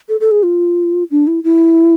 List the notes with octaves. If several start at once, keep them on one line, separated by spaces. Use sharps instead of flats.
A4
A4
G#4
F4
D4
E4
E4